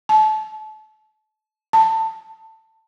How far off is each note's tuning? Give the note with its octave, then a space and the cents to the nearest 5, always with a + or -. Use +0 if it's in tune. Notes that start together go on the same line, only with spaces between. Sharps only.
A5 -30
A5 +15